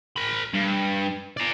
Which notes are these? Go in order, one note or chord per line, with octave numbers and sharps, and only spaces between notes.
A#4 B5
G2
D5 A#5